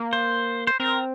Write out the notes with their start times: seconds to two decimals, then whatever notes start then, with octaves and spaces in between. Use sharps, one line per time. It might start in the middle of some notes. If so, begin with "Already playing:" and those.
Already playing: A#3
0.13 C5
0.67 C5
0.80 C4 A#4